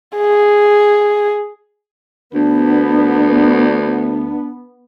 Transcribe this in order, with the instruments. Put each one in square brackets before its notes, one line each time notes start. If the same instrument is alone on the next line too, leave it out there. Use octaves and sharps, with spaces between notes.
[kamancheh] G#4
[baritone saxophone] D2 [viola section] B3 [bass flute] D4